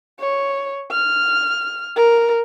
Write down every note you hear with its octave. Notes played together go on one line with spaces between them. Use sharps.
C#5
F6
A#4